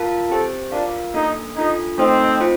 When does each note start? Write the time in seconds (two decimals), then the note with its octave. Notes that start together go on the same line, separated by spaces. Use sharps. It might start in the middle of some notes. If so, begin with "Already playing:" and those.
Already playing: F4 A#4 F5 A5
0.30 C4 G4 A4 C5 G5
0.72 D4 F4 A#4 F5
1.14 A#3 D4 D#4 A4
1.56 D4 D#4 F4 A4
1.98 A3 C4 D#4 A4 C5 D#5
2.40 C4 F4 C5 G5